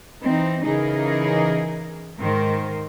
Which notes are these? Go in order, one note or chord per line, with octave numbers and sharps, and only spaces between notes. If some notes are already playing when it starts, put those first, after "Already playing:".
E3 C4 D#4
C#3 E3 D#4 G#4 A#4
G#2 D#3 A#4 C5